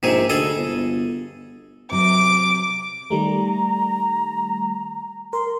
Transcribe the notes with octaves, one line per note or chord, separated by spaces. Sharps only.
A#1 G#2 C3 G#4
D2 G#4 A4 D#5
G1
C3 F#3 D6 D7
D#3 G3 A3 A#5
A#4 C6